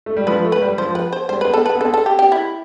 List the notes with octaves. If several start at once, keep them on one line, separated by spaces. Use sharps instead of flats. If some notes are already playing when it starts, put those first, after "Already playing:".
A3
G3
F3 B4
A3
B4
G3
F3 C5
B4
C5
G3 C5
B4
B3
A4
B4
B3
C4 A4
A4
G4
G4
E4